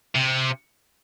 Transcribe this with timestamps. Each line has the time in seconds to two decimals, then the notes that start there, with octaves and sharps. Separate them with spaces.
0.16 C3